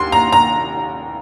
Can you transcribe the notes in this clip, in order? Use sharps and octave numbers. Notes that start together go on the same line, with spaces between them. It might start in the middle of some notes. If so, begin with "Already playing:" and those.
Already playing: D#2 C6
A#5
A#5